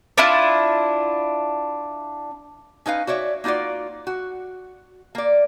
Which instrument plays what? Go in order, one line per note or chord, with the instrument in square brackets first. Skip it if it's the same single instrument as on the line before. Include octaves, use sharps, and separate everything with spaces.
[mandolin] D4 E4 F4
[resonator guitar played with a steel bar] C#4 D#4 B4 F5
F#4 C#5 D5 E5
A#3 D#4 F4 F#4 D5
F#4
A#3 D5